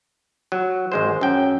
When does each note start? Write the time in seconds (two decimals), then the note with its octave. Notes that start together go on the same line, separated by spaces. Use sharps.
0.52 F#3
0.92 G#1 G#3 C5
1.21 F#2 C#4 G5